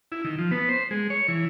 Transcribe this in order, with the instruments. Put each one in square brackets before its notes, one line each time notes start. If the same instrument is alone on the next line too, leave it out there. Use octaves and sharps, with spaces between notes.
[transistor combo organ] E4
D#3
F3
B3
C5
G#3
C#5
E3